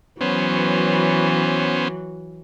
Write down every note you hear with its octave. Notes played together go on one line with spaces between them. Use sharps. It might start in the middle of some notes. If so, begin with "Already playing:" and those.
E3 F#3 B3 C#4 C5